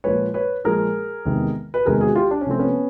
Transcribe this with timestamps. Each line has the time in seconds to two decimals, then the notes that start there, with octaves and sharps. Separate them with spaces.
0.04 A#2 F3 G#3 B4 C#5
0.34 B4 C#5
0.65 A#2 F3 G#3 G#4 A#4
1.25 E2 C3 D#3 G#3
1.74 B4
1.85 E2 C3 D#3 G#3 G#4 A#4
2.01 F#4 G#4
2.15 F4 G4
2.31 D4
2.41 C#4
2.47 C3 F3 A3 C4
2.59 B3 C#4